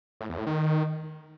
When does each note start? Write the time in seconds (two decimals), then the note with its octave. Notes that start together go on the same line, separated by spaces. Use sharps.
0.21 A2
0.29 E2
0.38 A2
0.47 D#3